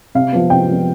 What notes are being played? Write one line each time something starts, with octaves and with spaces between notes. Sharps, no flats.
C3 F5
F3 B3
C3 G5
F3 B3